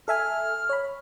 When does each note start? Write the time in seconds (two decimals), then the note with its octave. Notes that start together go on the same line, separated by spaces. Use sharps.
0.08 A4 E5 G#5 F6
0.69 C#5 B5